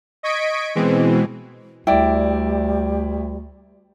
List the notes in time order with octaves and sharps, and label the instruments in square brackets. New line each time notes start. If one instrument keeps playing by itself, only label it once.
[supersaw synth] D#5 C#6 G#6 B6 D7
B2 E3 G#3 C4
[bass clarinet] D2 [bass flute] G3 [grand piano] E4 D5 [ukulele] G5